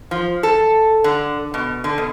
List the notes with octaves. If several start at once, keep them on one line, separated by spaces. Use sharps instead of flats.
F3
A4
D3
B2
D3
B2